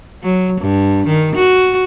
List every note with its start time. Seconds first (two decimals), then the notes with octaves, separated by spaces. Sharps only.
0.23 F#3
0.61 G2
1.07 D#3
1.36 F#4